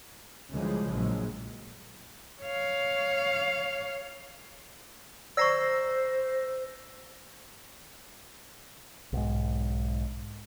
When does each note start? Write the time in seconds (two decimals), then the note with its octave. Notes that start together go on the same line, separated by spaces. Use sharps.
0.53 D2 C#3 E3 F3 G3 G#3
0.91 A#1 F#3 G#3
2.42 C#5 F5
5.37 C5 D5 A#5 C#6 E6 A#6 C7
9.13 B1 G#2